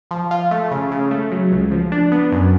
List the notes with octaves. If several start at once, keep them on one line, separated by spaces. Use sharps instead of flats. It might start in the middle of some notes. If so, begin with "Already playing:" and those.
F3
F4
A3
C#3
C#3
A3
F#3
C#2
F3
D4
B3
F#2